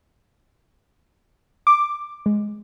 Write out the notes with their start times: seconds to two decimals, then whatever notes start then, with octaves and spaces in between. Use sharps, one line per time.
1.67 D6
2.26 G#3